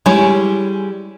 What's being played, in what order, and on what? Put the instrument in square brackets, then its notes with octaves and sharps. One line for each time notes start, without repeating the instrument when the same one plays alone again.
[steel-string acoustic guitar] G3 G#3 [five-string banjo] C#4 E4 C#5